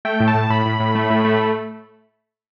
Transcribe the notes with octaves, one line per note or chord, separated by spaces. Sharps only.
A3 G5
A2
A5
A2
A2 B5
A2
A2
A3
A2
A3